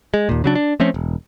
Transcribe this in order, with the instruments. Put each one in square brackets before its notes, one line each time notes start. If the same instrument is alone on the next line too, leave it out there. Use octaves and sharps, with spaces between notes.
[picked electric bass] G#3
D#2 A#2
C#3 F#3 D4
D4
F3 A3 C4 C#4
E1